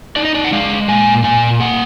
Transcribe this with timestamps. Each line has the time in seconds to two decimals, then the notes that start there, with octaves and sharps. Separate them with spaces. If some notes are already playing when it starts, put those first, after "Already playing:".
0.16 D#4 D5
0.25 D#5
0.34 D5
0.44 F#5
0.52 G#3 F5
0.88 A#2 G#5
1.23 A#2 G#5
1.60 A#3 F#5